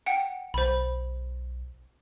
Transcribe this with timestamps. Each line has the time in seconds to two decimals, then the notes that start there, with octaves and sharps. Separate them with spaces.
0.06 F#5 G5
0.54 B1 C5 B5